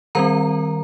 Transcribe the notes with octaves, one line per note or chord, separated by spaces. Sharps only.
D#3 G3 C4 A#4 A#5